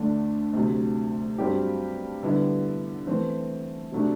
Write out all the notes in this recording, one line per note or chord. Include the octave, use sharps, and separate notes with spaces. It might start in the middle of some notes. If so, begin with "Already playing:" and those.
Already playing: D2 D3 A3 D4
D2 C3 F#3
G2 F#3 C4 G4
D3 G3 B3 E4
E3 A3 C4
C3 F#3 A3 D4